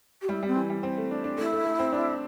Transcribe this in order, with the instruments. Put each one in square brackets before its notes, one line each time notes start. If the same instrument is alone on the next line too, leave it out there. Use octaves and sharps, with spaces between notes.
[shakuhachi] G4
[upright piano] G3 [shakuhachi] E4
[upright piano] G3 [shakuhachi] C4
[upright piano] E3
G3
C4
A3
D4
D4
[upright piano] A3 [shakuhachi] E4
[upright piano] A3
A3
C4
D4